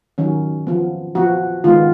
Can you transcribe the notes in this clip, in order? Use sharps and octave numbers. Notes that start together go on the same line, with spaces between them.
D#3 F#3 C#4
F3 B3
F3 B3 F#4
D#3 G#3 B3 F4